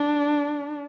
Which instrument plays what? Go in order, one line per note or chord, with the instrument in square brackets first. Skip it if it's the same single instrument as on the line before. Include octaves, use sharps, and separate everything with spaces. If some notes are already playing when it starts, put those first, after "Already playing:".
Already playing: [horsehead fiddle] D4